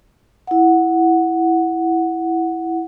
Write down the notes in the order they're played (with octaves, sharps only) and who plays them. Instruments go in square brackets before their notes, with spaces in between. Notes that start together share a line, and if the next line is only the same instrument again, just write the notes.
[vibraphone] E4 F#5